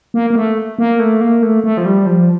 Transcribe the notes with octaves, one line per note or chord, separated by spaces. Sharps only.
A#3
A#3
A3
A#3
A3
A#3
A3
A3
F3
G3
F3